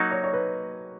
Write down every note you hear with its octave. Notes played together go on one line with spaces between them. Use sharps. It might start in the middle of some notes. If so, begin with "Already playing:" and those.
Already playing: F#3 A#3 D#4 F#4 D#5
C#5
C#5
B4